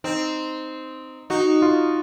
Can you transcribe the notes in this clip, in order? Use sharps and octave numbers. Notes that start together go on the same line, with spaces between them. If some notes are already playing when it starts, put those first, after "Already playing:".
C4 D#4
D#4 F#4
F4